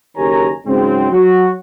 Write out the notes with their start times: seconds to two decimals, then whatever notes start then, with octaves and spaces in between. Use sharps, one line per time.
0.17 F#1 D#3 G4 C#5 G#5 A#5
0.66 G#2 C#3 F#3 C4
1.12 F#3 F#4